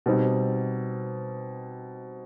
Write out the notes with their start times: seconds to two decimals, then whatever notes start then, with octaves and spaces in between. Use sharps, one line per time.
0.06 B2 G3 C4 D#4